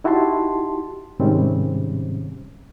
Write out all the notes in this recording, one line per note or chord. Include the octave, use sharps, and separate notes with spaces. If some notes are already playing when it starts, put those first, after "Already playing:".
D#4 E4 F#4 G4 A5 C6
G#2 C3 D#3 G3 C4 C#4